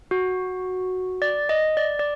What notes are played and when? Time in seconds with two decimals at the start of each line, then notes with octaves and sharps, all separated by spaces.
0.11 F#4
1.22 D5
1.49 D#5
1.77 D5
1.99 D5